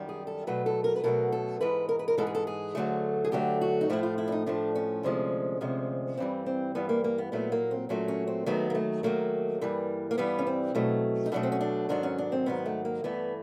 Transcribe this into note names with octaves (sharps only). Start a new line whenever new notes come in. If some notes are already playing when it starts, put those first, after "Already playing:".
Already playing: F#2 D#3 G3
G#4
A4
B2 F#3 A3 B4
A4
A#4
B4
B2 F#3 A3 A#4
A4
G#2 E3 G#3 B4
A#4
B4
A#4
G#2 E3 G#3 A4
G#4
A4
G#4
D2 D3 F#3 A3
G#4
D2 D3 F#3 A3 G4
F#4
D#4
A2 F3 A3 E4
F4
E4
D4
D#4
A2 F3 A3 D4
C#4
D2 C3 F3 G#3
D2 C3 F3 G#3
G2 E3 G3 C4
C4
G2 E3 G3 B3
A#3
A#3
B3
A#2 F#3 A3 B3
A#3
C4
A#2 F#3 A3 C#4
C#4
C4
D#2 D#3 F#3 A3 B3
A#3
A3
D#2 D#3 F#3 A3 A#3
G2 E3 G3
A#3
G2 E3 G3 B3
C#4
C4
B2 F#3 A3
D#4
B2 F#3 A3 D4
C4
C#4
D4
G#2 D#3 F#3 D4
C#4
D4
C4
G#2 D#3 F#3 B3
A3
A#3
G2 E3 A3 B3